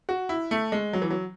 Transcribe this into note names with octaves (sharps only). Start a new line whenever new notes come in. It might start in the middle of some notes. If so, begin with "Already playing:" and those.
F#4
E4
A3
G#3
F#3
E3
F#3